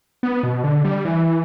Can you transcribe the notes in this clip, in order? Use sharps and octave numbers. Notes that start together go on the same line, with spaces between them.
B3
B2
D3
G3
E3